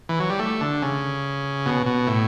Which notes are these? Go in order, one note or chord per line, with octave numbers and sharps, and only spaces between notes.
E3
F#3
G3
A3
D3
C#3
B2
B2
A2